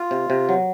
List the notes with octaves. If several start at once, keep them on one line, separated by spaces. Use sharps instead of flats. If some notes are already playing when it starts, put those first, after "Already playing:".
Already playing: F4
C3
C3
F#3